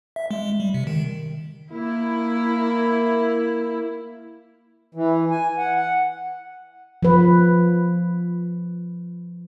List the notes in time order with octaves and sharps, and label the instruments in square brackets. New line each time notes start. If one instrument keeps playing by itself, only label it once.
[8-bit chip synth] E5
G#3
G3
C3
D#3
[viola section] A#3 E4
[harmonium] E3
G#5
F#5
F#5
[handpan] F3 B4